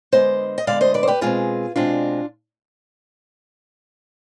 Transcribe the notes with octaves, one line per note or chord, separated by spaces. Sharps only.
D3 G#3 B3 C5 D#5
D#5
D3 G#3 B3 D5 F5
C5 D#5
B4 D5
C5
G4 B4
B2 G#3 C4 F4 G#4
B2 G#3 C4 D4 F4